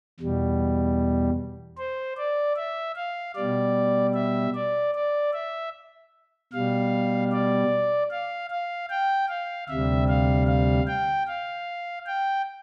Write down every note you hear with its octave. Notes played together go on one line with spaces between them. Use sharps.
E2 B2 G3
C5
D5
E5
F5
B2 G3 D5
E5
D5
D5
E5
B2 G3 F5
D5
F5
F5
G5
F5
D2 C3 G3 E5
F5
F5
G5
F5
G5